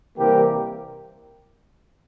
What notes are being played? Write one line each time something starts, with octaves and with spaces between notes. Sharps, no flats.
C3 E3 G3 A#3 G4 A#4